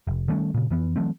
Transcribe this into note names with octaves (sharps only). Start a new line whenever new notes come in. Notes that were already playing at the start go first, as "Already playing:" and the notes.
F1
D#3 G3 A3 C#4
A#2 C#3
F2 E3 B3
E3 F#3 A3 C4